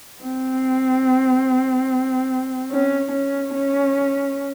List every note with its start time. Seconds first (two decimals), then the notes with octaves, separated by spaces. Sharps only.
0.22 C4
2.71 C#4
3.12 C#4
3.54 C#4